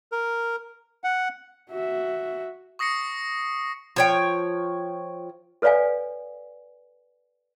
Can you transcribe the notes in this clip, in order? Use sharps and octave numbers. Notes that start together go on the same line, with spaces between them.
A#4
F#5
F#4 E5
C#6 D#6 A#6 C7 C#7
F3 C#5 G5
A4 B4 C#5 D5 F5 G#5